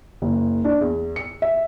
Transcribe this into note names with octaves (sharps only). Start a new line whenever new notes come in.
F#1
D4
E2
C#7
E5